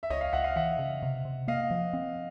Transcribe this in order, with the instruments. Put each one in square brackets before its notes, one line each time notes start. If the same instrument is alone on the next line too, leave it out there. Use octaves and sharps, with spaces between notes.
[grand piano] E5
[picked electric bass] C#2 [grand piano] C#5 D#5
[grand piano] D#5 F5
[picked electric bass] C#2 [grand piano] E5 F#5
[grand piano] D#5 F5
[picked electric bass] E3 [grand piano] E5 F#5
[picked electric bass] C#3
C3
C3
[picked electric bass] A#3 [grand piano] D#5 F5
[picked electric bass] F3
C4